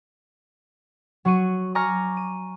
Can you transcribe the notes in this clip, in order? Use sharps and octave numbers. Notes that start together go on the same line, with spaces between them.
F#3 F#4 C#6 D#7
G#5 A#5 C#6 D6 F6 A#6
D#7